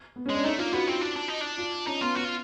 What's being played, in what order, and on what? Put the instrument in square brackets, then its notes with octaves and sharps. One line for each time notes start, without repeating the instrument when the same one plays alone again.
[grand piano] B3
C#4
[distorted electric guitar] G#3
[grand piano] D4
[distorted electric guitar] A3 [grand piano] D#4
[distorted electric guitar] A#3 [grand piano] F4
[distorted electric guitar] B3 [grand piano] F#4
[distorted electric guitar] C4 [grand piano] F#4
[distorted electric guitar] D4
D4
D#4
D4
[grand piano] F4
[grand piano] C#4 [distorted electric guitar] D#4
[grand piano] B3 [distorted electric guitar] F4
[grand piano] B3 [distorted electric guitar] F#4
[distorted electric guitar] F4